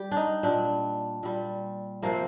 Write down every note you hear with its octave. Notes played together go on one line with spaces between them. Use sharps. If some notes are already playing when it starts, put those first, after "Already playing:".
Already playing: G3 G4
D4
D#4
A#2 G3 D4
A#2 G3
C3 F3 A#3
C4